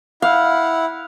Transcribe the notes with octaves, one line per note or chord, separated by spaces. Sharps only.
E4 F5 F#5